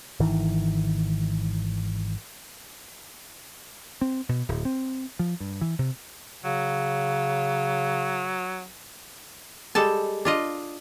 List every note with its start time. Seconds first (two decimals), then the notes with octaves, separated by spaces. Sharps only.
0.20 G#1 D#3 E3
4.01 C4
4.29 B2
4.49 D1
4.65 C4
5.19 F3
5.40 G2
5.61 E3
5.79 C3
6.44 C#3 F#3
9.75 G3 G#3 A4 A5
10.25 D4 F4 D#5